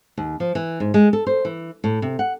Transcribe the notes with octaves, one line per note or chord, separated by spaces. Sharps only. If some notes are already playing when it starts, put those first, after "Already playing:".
D#2
F3
E3
G#2
G#3
A4
C5
E3
A2
C3
F#5